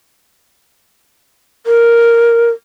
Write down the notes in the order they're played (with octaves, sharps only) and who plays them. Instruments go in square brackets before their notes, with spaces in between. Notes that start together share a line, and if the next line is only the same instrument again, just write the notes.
[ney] A#4